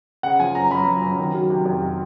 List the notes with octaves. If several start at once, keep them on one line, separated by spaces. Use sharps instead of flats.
C#3 F#5
F3 G#5
F#2 A#5
F#2 B5
F3
F#2
D#3
F#3
C3
F2
C3